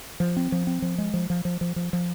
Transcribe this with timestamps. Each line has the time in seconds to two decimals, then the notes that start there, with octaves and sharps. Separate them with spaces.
0.20 F3
0.37 C4
0.52 F3
0.67 C4
0.82 F3
0.98 G#3
1.14 F3
1.30 F3
1.45 F3
1.61 F3
1.76 F3
1.93 F3